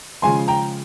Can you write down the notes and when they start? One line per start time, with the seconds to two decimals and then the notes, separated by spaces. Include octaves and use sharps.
0.22 C#3 F3 G#3 G#5 C6
0.48 G5 A#5